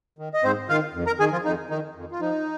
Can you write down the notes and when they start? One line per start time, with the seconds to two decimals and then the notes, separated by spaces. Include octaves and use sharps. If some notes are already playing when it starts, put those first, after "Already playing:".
0.19 D#3
0.34 D#5
0.44 G#2 C4 C5
0.69 D#3 F4 F5
0.94 F2
1.07 A#4 A#5
1.19 D#3 G#4 G#5
1.32 F3 F4
1.45 F2 D#4
1.70 D#3 D#4
1.95 F2
2.12 F4
2.20 F3 D#4